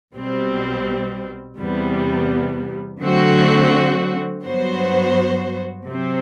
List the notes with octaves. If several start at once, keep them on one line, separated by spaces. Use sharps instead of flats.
B1 B2 G3 C4
E2 C3 G3 B3
D3 F#3 A3 C4 F#4
G2 F#3 B3 F#4 C5
C3 F#3 C4